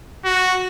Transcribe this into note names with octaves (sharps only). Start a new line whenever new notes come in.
F#4